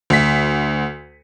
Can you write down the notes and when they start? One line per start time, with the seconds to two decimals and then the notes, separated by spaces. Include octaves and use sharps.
0.10 D2 B6